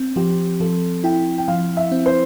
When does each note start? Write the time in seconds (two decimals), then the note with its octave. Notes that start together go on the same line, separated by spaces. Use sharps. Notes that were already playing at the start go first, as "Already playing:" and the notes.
Already playing: C4
0.16 F3 G4
0.60 F3 A4
1.04 E4 G5
1.38 G5
1.48 F3 F5
1.77 E5
1.92 C4
2.06 C5